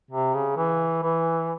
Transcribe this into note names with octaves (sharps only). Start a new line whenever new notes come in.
C3
C#3
E3
E3